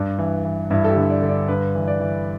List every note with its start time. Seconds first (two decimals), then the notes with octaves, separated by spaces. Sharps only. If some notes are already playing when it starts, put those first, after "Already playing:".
Already playing: G2 D4
0.19 E3
0.45 E3
0.70 G2 E4
0.85 A4
0.90 G4
0.96 D3
1.10 D5
1.22 D3
1.29 D5
1.48 G2 B4
1.75 E3
1.88 D5
2.00 E3